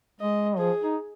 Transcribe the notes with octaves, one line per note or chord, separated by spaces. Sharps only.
G#3 D#5
F3 G#4
D#4